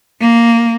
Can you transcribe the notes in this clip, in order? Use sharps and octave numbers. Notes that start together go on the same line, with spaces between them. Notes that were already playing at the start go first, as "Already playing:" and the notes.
A#3